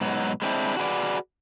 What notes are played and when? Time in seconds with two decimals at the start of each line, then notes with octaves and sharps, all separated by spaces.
0.01 G#2 B2 F#3
0.42 G#3 C4 D4 E4
0.77 F#4 G#4 B4 D5